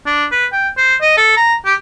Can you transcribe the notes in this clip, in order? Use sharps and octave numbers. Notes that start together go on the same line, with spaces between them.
D4
B4
G5
C5
D#5
A4
A#5
G4